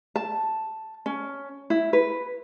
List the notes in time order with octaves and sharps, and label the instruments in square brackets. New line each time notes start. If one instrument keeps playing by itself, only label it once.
[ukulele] A5
C#4
E4
B4